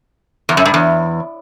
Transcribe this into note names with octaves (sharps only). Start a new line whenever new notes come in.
E2
F#2
G2
E2